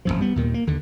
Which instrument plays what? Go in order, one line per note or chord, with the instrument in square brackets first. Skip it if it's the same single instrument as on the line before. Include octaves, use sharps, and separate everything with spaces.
[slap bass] F1 C2 F#2 F3
G3 B3
D#2 A#2 D#3
A#3
D#2 D3